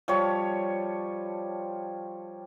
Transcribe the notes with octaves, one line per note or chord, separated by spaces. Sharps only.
F3 G3 C#5 C#6